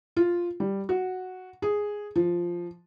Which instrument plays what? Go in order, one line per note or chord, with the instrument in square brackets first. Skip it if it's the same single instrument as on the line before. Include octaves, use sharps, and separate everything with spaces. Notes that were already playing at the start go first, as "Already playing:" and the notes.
[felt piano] F4
G3
F#4
G#4
F3